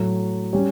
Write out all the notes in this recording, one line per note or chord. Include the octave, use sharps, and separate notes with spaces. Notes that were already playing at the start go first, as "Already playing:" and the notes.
Already playing: A2 F#3 A3
G3 C#4 G4 C#5